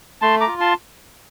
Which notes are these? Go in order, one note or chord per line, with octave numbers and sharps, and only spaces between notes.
A3 A5 C6
A#5 D6
F4
A5 C6